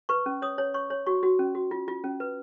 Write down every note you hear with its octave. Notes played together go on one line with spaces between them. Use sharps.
B4 C#6
C#4
C#5 D#6
C#5
C#5 C#6
C#5
F#4 C#6
F#4
C#4
F#4
F4
F4
C#4
B4